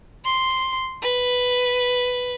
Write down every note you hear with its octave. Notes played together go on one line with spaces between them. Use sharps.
C6
B4